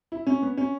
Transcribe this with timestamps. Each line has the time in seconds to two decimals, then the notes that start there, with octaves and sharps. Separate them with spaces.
0.12 E4
0.27 C#4
0.42 B3
0.57 C#4